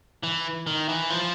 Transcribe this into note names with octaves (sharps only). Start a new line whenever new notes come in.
E3
D#3
E3
F3